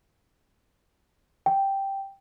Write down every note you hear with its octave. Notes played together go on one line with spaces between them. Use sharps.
G5